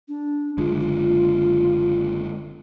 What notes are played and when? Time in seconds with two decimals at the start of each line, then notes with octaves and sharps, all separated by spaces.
0.08 D4
0.58 F#1 D3 G#3 F4
0.80 F4